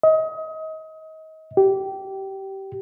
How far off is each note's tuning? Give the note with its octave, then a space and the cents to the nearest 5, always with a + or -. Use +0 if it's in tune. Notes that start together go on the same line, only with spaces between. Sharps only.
D#5 +30
G4 -20